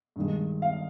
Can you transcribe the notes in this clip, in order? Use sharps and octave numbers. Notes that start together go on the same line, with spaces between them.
G2 D#3 G#3
F5